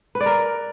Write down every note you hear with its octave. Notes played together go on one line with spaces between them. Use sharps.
B4
D5
A#4